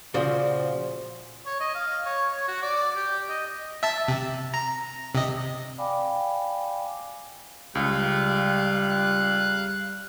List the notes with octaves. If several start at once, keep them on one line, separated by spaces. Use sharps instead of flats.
A#2 C#3 F3 F#4
C#5
D#5
F5
C#5
C#5
F#4
D5
G4
D#5
E5 A5
C3
A#5
C3 D#5
D5 F5 G5 G#5 B5 D6
C#2 G3 F5 F#6